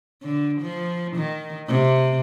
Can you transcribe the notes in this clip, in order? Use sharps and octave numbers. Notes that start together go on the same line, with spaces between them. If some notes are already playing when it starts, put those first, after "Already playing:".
D3
F3
D#3
C3